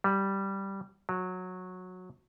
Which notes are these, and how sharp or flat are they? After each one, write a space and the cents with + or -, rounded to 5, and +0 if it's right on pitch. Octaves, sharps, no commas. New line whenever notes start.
G3 -5
F#3 -15